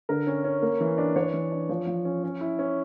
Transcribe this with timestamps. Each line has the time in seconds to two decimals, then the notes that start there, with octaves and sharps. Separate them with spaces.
0.09 D3 A#4
0.27 C#4
0.44 C#4
0.62 A#3
0.81 E3
0.98 D4
1.16 E3 C#5
1.34 E3
1.52 D4
1.69 F3 C#5
1.87 F3
2.05 C#4
2.23 C#4
2.41 E4
2.59 C#4